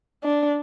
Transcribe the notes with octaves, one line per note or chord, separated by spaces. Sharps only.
D4